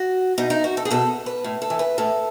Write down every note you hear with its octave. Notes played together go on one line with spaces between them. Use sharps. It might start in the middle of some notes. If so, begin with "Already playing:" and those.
Already playing: F#4
B2 D#4
D#4
F#4
A4
G#4
B2 A4
B4
A2
A4
E3
B4
A2 A4